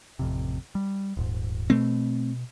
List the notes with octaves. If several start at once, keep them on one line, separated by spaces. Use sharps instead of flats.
A1 F2 C3
G3
D#1 G#2
B2 A3 C4